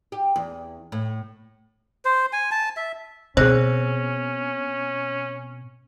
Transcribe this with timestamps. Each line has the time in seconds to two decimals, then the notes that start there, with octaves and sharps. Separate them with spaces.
0.12 G4
0.36 E2
0.92 A2
2.05 C5
2.33 G#5
2.51 A5
2.77 E5
3.37 B2 C4 C#4 G#4 C5